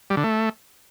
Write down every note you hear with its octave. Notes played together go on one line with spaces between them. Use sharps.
G3
D3
A3